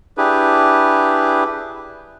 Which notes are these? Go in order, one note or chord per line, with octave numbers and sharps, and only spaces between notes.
D4 E4 G4 G#4 B4